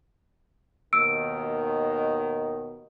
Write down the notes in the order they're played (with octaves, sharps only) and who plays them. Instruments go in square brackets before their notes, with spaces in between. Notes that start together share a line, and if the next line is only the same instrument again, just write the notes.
[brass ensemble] D#2 B2 D#3 [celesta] E6 D7